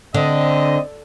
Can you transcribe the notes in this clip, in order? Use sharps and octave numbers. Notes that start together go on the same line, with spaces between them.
D3 C4 D#5